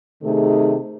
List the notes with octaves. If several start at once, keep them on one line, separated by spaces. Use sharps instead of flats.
C3 D#3 A3 D#4 G#4